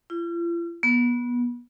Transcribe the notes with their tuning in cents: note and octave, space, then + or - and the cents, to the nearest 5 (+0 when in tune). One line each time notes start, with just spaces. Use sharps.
F4 -45
B3 -25